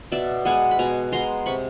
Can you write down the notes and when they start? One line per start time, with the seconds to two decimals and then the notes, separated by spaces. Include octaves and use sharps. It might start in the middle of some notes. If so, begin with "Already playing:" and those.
0.12 B2 D5 E5
0.45 G#3 B3 F#5 G#5
0.71 B5
0.79 B2 G#5 A#5
1.12 G#3 B3 A#5 C6
1.46 C3 B5 C#6